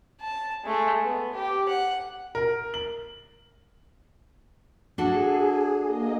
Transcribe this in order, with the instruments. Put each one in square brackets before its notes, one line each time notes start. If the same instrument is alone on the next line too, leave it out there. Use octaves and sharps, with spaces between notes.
[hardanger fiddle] A5
G#3 A3
B3
G4
F#5
[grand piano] A#4
F#7
[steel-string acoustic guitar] D4 F#4 A4 [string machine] G#4
[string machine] A#3 D#5